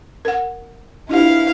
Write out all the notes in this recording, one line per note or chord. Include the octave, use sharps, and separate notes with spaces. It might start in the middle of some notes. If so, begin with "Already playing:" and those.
A#4 F#5
D4 E4 F4 G4 F5